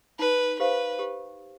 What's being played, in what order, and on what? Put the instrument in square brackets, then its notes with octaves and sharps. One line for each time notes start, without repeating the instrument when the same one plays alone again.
[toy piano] D#4 [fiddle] B4
[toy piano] G4 C5 F5 [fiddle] B4
[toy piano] G4